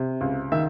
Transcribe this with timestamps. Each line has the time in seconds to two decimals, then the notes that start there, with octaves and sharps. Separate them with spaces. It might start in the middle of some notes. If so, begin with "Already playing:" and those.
Already playing: C3
0.21 C#2
0.52 D#3 E5